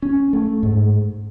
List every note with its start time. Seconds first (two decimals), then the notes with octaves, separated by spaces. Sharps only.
0.02 C#4
0.33 A3
0.63 G#2